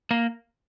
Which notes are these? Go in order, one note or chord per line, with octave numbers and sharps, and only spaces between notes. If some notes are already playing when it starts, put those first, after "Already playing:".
A#3